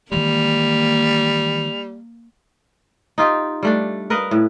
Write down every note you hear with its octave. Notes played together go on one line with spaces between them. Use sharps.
D#3 E3 G3 G#3 A#3 F7
D#4 F4 G4
G3 A3 D4
A#4 B4 D#5 F5
A2